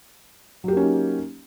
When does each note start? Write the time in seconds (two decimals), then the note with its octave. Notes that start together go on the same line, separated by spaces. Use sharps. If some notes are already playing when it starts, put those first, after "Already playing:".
0.64 F#3
0.68 G4
0.72 A#3
0.77 C#4
0.81 D#4